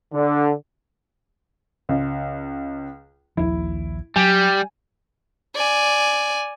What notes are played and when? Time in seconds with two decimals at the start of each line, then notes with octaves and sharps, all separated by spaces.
0.13 D3
1.89 C#2
3.37 A#1 D#2 F3 E4
4.16 F#3 G3 G#5
5.56 D5 G#5